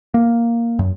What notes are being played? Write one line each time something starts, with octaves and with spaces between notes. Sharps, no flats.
A#3
F#2